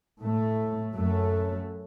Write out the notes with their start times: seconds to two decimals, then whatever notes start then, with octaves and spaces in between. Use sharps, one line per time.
0.20 A2 A3
0.95 F#2 F#3 A3